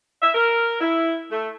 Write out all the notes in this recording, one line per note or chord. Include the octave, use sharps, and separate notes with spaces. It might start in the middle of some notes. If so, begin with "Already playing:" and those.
E5
A#4
E4
A3